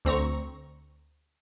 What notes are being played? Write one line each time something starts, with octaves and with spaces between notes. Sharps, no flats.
D2 C4 A#5 C#6